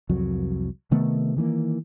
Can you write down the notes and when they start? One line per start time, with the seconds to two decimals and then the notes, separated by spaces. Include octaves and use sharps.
0.09 C2 F2 F#3
0.91 C3 D#3 A3 B3
1.37 D#3 E3 A3 A#3